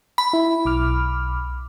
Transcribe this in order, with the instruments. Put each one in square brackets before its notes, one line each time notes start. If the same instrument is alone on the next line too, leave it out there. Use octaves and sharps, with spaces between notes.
[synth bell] B5
[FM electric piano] E4
B1 D6 F6